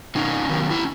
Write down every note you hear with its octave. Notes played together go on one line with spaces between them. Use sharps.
C3 C#4 D#4
D#3 F#3
E4